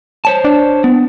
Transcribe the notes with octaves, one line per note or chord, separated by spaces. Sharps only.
C5 C#5 A5
D4
B3